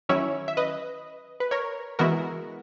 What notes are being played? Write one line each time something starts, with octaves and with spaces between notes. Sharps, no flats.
D#3 F#3 C#4 E4 C#5 E5
E5
B4 D#5
B4
A#4 C#5
E3 G#3 B3 E4 F#4 A#4